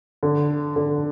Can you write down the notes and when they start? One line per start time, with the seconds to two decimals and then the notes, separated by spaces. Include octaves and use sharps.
0.23 D3
0.76 D3